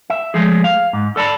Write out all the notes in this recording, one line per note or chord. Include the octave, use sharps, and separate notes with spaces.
E5
F3 G#3 A3 G#4
F5
G#2
A4 D5 A5 B5